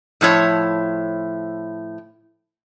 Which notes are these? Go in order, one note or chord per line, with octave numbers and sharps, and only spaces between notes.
A2 F3 E4 C#5